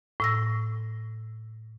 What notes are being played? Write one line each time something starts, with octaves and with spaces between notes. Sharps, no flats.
A2 E6 A#6